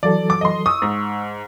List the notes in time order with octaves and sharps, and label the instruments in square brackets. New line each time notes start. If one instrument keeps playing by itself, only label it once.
[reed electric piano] E3 F#3 A4 [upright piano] D5
[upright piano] D6
D#5 C6
[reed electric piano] C#6 E6 [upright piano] D#6
[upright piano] G#2